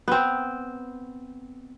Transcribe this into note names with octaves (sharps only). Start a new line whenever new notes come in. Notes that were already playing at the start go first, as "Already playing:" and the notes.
B3 C4